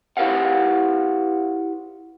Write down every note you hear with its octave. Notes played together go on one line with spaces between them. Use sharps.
E4 G4 B4 C#5 F5 F#5